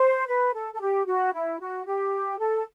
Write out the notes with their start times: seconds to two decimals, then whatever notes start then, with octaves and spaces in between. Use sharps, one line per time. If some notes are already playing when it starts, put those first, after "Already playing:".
Already playing: C5
0.27 B4
0.54 A4
0.74 A4
0.80 G4
1.06 F#4
1.33 E4
1.60 F#4
1.86 G4
2.39 A4